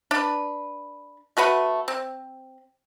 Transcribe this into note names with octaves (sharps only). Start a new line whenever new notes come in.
D4 B4
A3 F#4 B4 F#5
C4